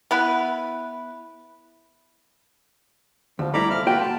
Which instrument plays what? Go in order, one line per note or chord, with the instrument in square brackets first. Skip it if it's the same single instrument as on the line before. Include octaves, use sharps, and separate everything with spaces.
[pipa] B3 E4 B4
[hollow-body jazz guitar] D2 [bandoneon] F3
[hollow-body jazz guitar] G3 A3 E4 [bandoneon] A#5 B5 D6
[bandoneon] F2 F3 F6 [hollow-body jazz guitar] E5
[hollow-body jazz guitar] A#3 F#4 G5 [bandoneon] F4 B4 B5
[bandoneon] A5